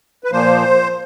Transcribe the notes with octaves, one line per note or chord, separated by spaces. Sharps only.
B4
A#2 F3 A#3 C5